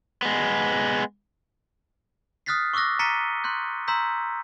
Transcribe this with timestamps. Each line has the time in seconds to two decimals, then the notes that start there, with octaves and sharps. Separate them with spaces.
0.23 G#3 B3
2.46 D#6 F6 F#6 A6 B6 C7
2.74 C#6 D6 E6 F#6 A#6
2.99 A#5 A6 B6 C#7 D#7 G7
3.44 C6 F#6 G6
3.88 A#5 C6 E6 G6 B6